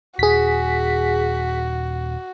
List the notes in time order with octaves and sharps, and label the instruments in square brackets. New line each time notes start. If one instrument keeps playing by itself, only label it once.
[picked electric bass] D#1 [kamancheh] F#4 [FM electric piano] G#4 B6